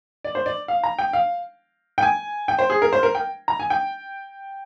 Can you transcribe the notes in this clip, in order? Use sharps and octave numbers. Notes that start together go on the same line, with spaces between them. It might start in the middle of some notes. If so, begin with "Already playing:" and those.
D5
C5
D5
F5
A#5
G5
F5
G5
G#5
G5
C5
G#4
A#4
C5
A#4
G5
A#5
G#5
G5